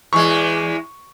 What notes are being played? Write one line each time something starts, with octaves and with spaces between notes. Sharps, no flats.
E2 G#3 C#6